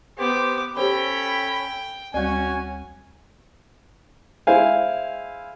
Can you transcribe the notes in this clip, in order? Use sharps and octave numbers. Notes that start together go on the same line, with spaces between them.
B3 G4 C5 D6
C#4 G4 A4 C5 C#5 G5 B5
D2 G3 C#4 F#4 G#5
G#3 E4 C5 F5 G#5